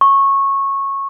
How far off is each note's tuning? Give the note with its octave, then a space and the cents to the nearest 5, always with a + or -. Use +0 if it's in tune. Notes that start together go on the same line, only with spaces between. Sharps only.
C#6 -15